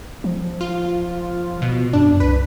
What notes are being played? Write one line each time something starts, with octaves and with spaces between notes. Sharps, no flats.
F3
F4
B2
F#2 D4
C2 B4